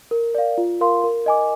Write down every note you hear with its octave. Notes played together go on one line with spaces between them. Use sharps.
A#4
D5 F5
F4
A#4 F5 C6
A#4
D#5 G#5 D6